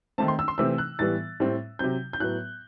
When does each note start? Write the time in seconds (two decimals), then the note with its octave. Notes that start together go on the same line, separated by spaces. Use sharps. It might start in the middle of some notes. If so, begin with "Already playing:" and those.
0.18 D#3 A3 C4 A5
0.28 C6
0.39 E6
0.48 C6
0.58 C3 E3 A3 C4 E6
0.78 F#6
0.99 A2 E3 G3 B3 A6
1.40 A2 G3 C4
1.79 C3 F#3 C4 G6
2.13 G6
2.20 A2 F#3 B3 F#6